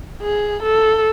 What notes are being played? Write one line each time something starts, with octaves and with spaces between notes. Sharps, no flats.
G#4
A4